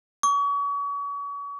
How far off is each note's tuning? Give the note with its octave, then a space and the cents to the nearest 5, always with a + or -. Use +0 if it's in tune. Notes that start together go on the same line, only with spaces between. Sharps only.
C#6 +35